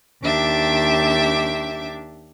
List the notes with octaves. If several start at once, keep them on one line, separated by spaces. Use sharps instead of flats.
D#2 D4 G4 E5 D6